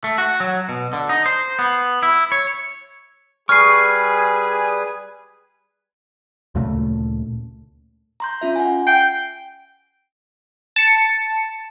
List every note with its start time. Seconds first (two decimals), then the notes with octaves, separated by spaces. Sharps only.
0.04 A3
0.18 F#4
0.40 F#3
0.69 B2
0.93 D3
1.09 D#4
1.26 C5
1.59 B3
2.03 E4
2.32 C#5
3.49 G3 G#4 B4 G#5 C#6 F6 C7
6.55 D2 A#2 C#3 A3
8.20 A#5 C6 G6
8.41 C#4 F4 E5
8.56 F#5 G#5
8.87 G5 C7
10.76 A5 C#7